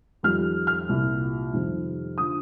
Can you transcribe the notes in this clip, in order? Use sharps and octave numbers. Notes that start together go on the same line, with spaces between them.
F2 D#3 G3 F6
F6
C2 A#2 F3
F2 C3 D#3 G3
D3 F3 D#6